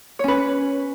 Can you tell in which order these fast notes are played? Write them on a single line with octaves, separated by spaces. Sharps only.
C#5 C#4 B4